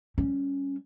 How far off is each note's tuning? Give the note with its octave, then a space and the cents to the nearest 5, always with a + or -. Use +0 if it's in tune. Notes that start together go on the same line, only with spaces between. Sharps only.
G3 -10 C#4 +0